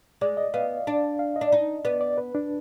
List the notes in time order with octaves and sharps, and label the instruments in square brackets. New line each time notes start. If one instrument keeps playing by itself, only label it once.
[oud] G#3 [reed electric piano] D5
[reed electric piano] D#5
[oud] B3 [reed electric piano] F5
[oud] D4
[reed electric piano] F5
D#5
[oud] D4
D#4
[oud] B3 [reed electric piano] D5
[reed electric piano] D5
B4
D4